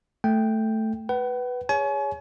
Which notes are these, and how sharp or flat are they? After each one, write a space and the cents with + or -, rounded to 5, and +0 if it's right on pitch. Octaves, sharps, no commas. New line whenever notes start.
A3 +0 G5 +0
B4 +0 F#5 +40
G#4 -25 C#5 +15 G#5 +35